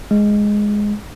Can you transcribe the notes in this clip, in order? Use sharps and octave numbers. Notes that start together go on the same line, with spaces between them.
G#3